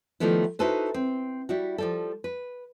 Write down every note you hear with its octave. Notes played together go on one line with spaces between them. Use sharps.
D#3 F3 G3 A3 B3 E4
D#4 E4 F#4 A4 B4 C5
C4
G3 E4 F#4
F3 G3 A4
B4